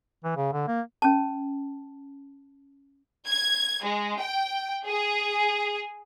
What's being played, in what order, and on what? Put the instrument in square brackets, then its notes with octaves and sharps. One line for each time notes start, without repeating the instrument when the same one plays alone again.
[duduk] E3
C#3
D3
A#3
[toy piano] C#4 A5
[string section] G#6
G#3
G5
G#4